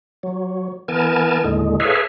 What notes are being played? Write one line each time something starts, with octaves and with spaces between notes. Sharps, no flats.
F#3
E3 B3 A#4 G#5 A5
D#2 A2 D3 G#3
G#4 A4 B4 C#5 E5 F5